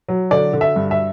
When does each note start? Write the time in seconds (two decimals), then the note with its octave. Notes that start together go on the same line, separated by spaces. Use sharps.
0.08 F#3
0.31 D3 D5
0.53 D3
0.61 E5
0.76 G2
0.91 E5